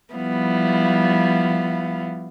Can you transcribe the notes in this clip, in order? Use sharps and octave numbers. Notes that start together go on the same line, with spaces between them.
F3 G3 B3 E4 F5